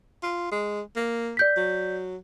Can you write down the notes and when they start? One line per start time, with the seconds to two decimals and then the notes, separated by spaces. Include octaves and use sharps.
0.23 F4
0.51 G#3
0.96 A#3
1.37 D5 G6 B6
1.57 F#3